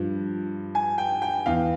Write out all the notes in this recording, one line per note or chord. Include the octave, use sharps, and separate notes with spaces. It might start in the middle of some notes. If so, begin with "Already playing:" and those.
Already playing: G2 F3
G#5
G5
G5
E2 E3 F5